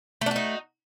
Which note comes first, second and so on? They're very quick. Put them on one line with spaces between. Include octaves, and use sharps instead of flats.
A3 D4 F#4 D#4